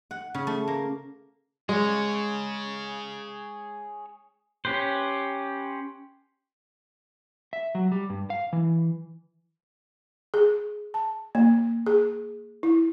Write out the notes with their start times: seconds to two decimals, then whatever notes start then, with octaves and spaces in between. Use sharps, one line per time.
0.11 F#5
0.34 C#3
0.47 A3
0.68 A#3
1.69 G#3 G#4 C#5
4.65 C#4 G4 B4 C5
7.53 E5
7.75 F#3
7.92 G3
8.10 G2
8.30 F5
8.53 E3
10.34 G#4
10.94 A5
11.35 A#3
11.87 G#4
12.63 E4